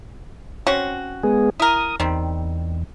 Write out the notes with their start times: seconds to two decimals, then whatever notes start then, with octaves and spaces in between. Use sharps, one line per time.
0.67 C4 C#4 F#4
1.23 G#3 B3 G#4
1.60 E4 A#4 D#6
2.00 E2 D#3 G3 C4